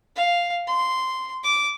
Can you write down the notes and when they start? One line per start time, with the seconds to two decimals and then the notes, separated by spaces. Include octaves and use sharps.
0.16 F5
0.68 C6
1.44 D6